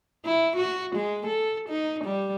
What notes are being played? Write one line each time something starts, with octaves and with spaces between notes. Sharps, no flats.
E4
F#4
G#3
A4
D#4
G3